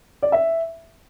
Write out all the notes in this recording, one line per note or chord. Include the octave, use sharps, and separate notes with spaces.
D5
E5